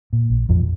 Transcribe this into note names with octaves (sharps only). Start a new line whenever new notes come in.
A#2
A#1
A1 F2 F3